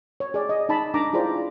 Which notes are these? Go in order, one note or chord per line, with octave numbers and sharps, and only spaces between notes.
C#5
G#4 D5
D#5
D#4 A5 B5
D4 D#4 A#5 D6
E4 F4 G#4 C5 D5